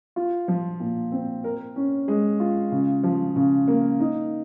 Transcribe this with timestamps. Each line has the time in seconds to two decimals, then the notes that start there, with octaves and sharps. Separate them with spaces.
0.16 F4
0.48 F3
0.80 A#2
1.12 C4
1.44 A#4
1.76 C#4
2.08 G#3
2.40 F4
2.72 C#3
3.03 F3
3.36 C#3
3.68 A#3
4.00 D#4